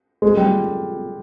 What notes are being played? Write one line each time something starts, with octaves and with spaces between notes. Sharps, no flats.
G#3
G3